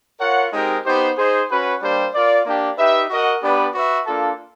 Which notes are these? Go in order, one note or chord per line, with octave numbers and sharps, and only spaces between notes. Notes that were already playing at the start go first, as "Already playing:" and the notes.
F4 A#4 C#5 F#5
G#3 C4 D#4 G4 A#4
B3 D#4 G4 C5
D#4 G#4 C5
C#4 F#4 B4
G3 A#3 D4 G4 C5
F4 A#4 D5
A#3 D4 G4
D#4 G4 B4 E5
F#4 A#4 D#5 F#5
B3 D4 G4 B4 D5
F#4 B4 E5
A#3 D4 F4 A4